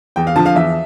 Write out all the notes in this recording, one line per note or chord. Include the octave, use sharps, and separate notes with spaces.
E2 G5
F5
D3 F3 A5
F5
E2 E5